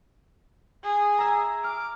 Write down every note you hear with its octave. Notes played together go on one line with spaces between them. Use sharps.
G#4
E5 A#5
D6 F6